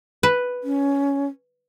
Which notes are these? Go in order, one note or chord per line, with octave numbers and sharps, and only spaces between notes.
B4
C#4